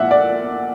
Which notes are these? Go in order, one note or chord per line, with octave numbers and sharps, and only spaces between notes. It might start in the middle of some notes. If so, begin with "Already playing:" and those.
Already playing: A#2 E5 F#5
D5